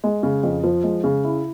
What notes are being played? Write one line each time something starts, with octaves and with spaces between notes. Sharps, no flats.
G#3
C#3
F2
F3
G#3
C#3
E4